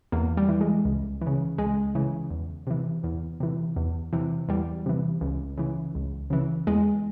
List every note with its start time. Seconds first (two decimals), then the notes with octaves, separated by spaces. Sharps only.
0.12 E2 A#3
0.37 G3
0.49 E3
0.61 G#3
0.85 C#2
1.21 E3
1.27 C#3
1.58 C#2 G#3
1.95 C#3 E3
2.31 E2
2.67 C3 E3
3.04 E2
3.40 C3 E3
3.76 E2
4.13 C3 E3
4.49 E2 G3
4.86 C3 E3
5.21 C#2
5.58 C#3 E3
5.95 C#2
6.30 C#3 E3
6.67 E2 G#3